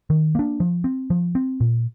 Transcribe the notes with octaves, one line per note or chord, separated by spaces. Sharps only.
D#3
A#3 D4
F3
C4
F3
C4
A#2